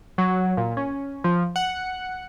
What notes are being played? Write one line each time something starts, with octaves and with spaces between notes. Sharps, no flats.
F#3
A#2
C#4
F3
F#5